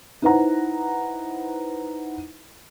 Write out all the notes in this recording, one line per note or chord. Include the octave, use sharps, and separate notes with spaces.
D#4 E4 B4 C5 F#5 A#5